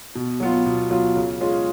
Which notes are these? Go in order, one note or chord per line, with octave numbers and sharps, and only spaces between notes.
B2
F#3 B3 F4
B2
F#3 B3 F4
C#3
G#3 C#4 F4 G#4